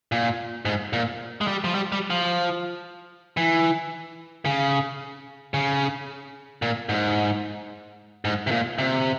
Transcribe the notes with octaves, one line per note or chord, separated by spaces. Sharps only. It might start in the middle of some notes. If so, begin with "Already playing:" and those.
A#2
G#2
A#2
G#3
G3
F3
G3
G3
F3
E3
C#3
C#3
A#2
G#2
G#2
C3
A#2
C3